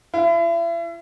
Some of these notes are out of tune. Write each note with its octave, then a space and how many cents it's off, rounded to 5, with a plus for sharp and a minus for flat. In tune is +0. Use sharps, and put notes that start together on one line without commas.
E4 +40